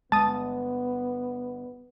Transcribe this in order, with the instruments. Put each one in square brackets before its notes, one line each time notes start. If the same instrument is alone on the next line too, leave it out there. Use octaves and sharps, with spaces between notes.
[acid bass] G1 [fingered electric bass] G#3 [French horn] B3 [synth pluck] A5 D#6